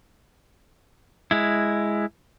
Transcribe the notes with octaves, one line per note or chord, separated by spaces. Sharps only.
G#3 E4